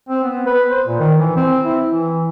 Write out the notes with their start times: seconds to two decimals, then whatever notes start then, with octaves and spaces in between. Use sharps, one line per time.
0.09 C4
0.24 B3
0.47 B4
0.71 C5
0.87 A#2
1.00 D#3
1.19 E3
1.36 C4
1.65 E4
1.88 E3